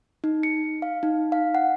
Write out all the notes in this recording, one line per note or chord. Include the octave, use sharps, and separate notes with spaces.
D#4
C#7
F5
D#4
F5
F#5